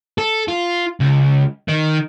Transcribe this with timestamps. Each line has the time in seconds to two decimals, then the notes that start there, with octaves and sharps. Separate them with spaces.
0.18 A4
0.48 F4
1.00 C#2
1.68 D#3